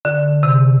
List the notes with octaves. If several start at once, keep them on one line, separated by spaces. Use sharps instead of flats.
D3
C3